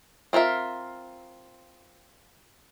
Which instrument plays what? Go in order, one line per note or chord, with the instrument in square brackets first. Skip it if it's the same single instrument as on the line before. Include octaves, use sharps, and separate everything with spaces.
[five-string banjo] C4 F4 A#4 E5